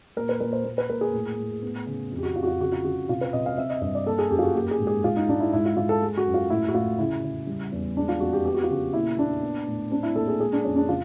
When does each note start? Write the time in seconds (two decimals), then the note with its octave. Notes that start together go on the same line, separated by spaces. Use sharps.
0.17 A#2 A#4
0.29 B4
0.40 A#2 A#4
0.53 C5
0.65 A#2
0.78 B4
0.89 A#2 A#4
1.01 G#4
1.13 A2
1.38 A2
1.62 B3
1.87 C#3
2.11 F2
2.18 G4
2.23 F#4
2.36 F2 F4
2.43 F#4
2.47 F4
2.60 C#3 F#4
2.72 F4
2.84 C#3 F#4
3.09 C3 F4
3.21 B4
3.33 C3 D#5
3.46 F5
3.58 C4 E5
3.70 D#5
3.82 G2 D#5
3.95 D5
4.06 A#3 A4
4.19 G#4
4.31 F#2 G4
4.39 F4
4.43 F#4
4.55 A#3 G4
4.71 G#4
4.79 G#2
4.87 G#4
5.04 G#2 F4
5.16 D#4
5.28 G#2 D4
5.40 E4
5.53 G#2 E4
5.65 F4
5.76 G#2 F4
5.89 A4
6.02 G#3
6.17 F#4
6.26 F#2
6.34 F4
6.50 A2 E4
6.68 F#4
6.74 A2 F4
6.98 C#3 E4
7.24 C#3
7.47 G3
7.72 E2
7.96 G#3 D4
8.09 F4
8.20 F2 F#4
8.33 G4
8.45 B3 G4
8.54 F#4
8.63 F4
8.70 C#3 F#4
8.93 A#2 E4
9.18 A#2 D4
9.43 B3
9.67 A2
9.91 C4 D4
10.03 E4
10.15 A#2 A4
10.28 G#4
10.40 G#3 G#4
10.53 D4
10.65 F2 C#4
10.76 D4
10.89 C#3 F4